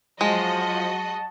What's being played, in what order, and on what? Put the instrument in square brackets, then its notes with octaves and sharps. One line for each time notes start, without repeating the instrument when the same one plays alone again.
[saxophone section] F3 [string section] F#3 F#4 D#5 [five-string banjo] G#3 [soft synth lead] A5